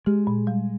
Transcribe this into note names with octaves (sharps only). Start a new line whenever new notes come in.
G#3 G4
A#2
G3